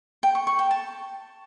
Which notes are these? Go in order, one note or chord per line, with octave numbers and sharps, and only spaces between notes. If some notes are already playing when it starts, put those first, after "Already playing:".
G5
C#6
C#6
G5
A5